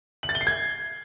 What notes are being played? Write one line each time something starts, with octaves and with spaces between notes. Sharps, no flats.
F#7
A6
G7
C7
G#6